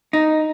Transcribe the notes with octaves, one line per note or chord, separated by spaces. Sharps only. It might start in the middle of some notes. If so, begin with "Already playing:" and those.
D#4